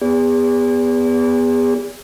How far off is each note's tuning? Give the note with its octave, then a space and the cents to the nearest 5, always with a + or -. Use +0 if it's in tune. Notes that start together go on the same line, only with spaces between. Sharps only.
B3 +0 G#4 -40 D5 -35